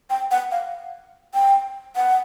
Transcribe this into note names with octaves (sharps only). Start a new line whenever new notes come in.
G5
F#5
F5
G5
F#5